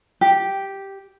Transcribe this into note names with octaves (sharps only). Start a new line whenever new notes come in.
G4